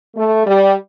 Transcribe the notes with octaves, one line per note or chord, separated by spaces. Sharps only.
A3
G3